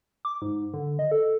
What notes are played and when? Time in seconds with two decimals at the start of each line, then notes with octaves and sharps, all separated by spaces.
0.25 D6
0.42 G#2
0.73 D3
0.99 D#5
1.11 A4